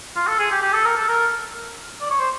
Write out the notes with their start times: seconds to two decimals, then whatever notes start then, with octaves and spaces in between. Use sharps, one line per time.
0.16 F4
0.27 A4
0.39 G#4
0.51 G4
0.62 G4
0.73 A4
0.85 A#4
0.97 A4
1.09 A#4
2.01 D5
2.10 C#5
2.19 C5